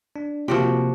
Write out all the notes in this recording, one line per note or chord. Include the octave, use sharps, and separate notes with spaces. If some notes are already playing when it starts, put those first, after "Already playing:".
D4
C3 F3 A#3 F#4 G4